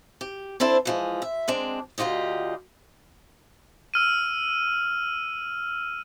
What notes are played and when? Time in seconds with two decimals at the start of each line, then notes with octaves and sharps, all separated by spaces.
0.21 G4
0.60 C4 D4 E4 A4 C5
0.85 E3 F3 G#3
1.22 E5
1.48 G#3 C4 D4
1.98 D2 D3 F4 G4 D#5
3.94 E6 F6 D#7